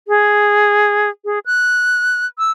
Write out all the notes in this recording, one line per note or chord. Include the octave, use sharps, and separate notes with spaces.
G#4
G#4
F#6
E6